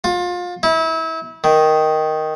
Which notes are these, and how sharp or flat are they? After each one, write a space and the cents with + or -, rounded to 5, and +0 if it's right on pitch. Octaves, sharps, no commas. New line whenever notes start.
F4 +30
E4 -30
D#3 +0